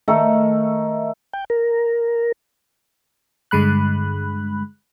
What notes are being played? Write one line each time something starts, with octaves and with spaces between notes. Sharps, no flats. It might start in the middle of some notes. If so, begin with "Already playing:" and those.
D#3 A3 A4
G5
A#4
G2 D3 G#3 B5 F#6